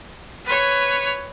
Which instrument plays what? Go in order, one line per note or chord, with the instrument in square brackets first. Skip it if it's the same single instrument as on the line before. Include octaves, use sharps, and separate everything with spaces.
[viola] B4 C#5